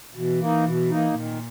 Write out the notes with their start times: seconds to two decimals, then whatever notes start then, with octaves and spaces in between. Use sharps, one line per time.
0.15 B2 E3
0.40 A#3 D#4
0.65 B2
0.90 A#3 D#4
1.14 A#2 D#3